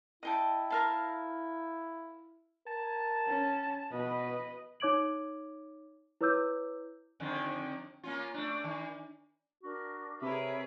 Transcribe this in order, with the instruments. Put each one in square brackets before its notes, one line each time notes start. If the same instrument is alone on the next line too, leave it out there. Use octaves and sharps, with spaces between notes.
[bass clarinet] E4 [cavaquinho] D#5 G5 A5
[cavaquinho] A#4 F5 A5
[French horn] A#4 [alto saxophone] A5
[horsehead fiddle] C#4
[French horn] B2 [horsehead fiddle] B4 D#5
[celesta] D#4 C#5 D6 G#6 D7 F#7
E4 B4 C#5 D6 E6 G6
[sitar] F2 D3 D#3
A#3 C#4 F4
A3 D4
D#3
[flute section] D4 A#4 [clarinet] F#4
[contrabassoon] C3 [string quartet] G#4 A#4 B4 [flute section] C#5 B5 [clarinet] E5